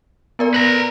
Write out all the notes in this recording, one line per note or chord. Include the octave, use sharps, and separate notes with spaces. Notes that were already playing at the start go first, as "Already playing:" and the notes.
B3 A#4 D5
B4 A#5